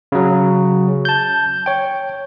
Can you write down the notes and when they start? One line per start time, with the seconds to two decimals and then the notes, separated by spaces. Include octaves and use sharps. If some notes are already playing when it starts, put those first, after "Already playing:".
0.12 C#3 F#3
1.05 A5 G6
1.66 C#5 G5